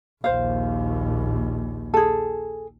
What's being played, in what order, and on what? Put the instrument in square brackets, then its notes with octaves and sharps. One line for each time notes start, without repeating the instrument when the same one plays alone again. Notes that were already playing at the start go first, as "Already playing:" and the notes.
[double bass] A#1 D#2 [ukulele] C5 F5
[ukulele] G#4 A4